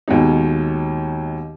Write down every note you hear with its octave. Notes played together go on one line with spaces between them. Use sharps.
D#2 B2 G#3 D#4